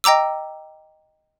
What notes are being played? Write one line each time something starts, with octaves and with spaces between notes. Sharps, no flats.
D#5 G5 A#5 D6 E6